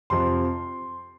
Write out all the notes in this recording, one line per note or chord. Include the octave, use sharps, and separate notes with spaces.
F2 C3 F3 C6